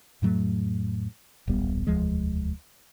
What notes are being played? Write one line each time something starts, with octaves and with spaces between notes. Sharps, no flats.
F2 A2 F#3 A3
D1 A#1 G3 B3
E1 D2 F3 G#3